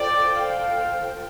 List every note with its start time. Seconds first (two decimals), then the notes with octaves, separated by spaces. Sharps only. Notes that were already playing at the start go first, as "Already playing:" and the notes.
Already playing: F4 A4 C5 D5 G5
0.36 F5